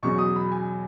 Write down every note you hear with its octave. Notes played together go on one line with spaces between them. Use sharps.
E2 B2 F#3 C#6
D#6
B5
G#5